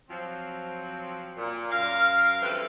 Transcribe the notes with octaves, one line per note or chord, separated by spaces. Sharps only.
F3 F#3 C4
A#2
F#2 A#4 F5
G2 E3 C4 A4 B4